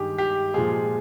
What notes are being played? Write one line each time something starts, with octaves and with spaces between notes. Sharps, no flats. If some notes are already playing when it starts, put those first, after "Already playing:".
Already playing: G2 D#3 G#3 G4 G#4
G4
A#2 F3 G#3 G#4